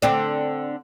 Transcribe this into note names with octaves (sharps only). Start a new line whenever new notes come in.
D3 C4 D4